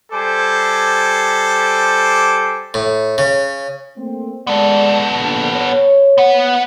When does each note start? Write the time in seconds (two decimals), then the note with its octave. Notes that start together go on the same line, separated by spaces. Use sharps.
0.12 G3 A4 C5 G#5 D6
2.74 A2
3.18 C#3
3.97 A3 A#3 C4
4.47 G#3 B3 A4 D5
5.19 A#1 D3
5.55 C#5
6.18 B3 F#5